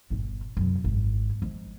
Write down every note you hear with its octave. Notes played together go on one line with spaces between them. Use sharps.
G1 A#2
F#2 C3
G#1 E4
F3 G#3